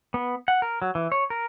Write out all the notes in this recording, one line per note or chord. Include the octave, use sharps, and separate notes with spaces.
B3
F#5
A#4
F#3
E3
C#5
A#4